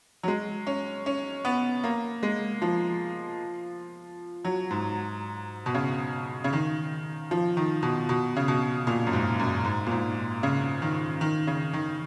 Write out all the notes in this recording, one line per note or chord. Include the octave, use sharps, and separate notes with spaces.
F#3
G#3
C#4
C#4
B3
A#3
G#3
F3
F#3
G#2
B2
C#3
C#3
D#3
F3
D#3
B2
B2
C#3
B2
A#2
F#2
G#2
F#2
G#2
A#2
G#2
C#3
D#3
D#3
C#3
D#3